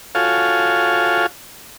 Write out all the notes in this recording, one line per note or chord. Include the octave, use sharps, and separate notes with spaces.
F4 F#4 A4 C#5 F5 G#5